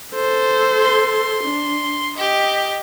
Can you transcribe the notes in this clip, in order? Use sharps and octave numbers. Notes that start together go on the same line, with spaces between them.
A4 C5
C6
D4
G4 D#5